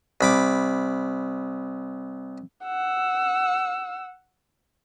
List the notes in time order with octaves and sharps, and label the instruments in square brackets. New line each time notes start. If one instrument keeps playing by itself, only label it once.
[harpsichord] C2 B5 D6
[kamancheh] F#5 E6